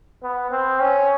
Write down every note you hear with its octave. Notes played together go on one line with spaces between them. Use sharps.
B3
C4
C#4